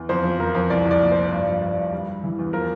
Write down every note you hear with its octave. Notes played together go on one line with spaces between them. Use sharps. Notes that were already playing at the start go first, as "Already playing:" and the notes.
Already playing: E2
F2 C5
F3
F3 A#4
F2
C2 D5
C2
D5
A#2
C5
A#2
G2 D5
F3
G2 D5
G2
G3
G3
E3
E2
F3 A#4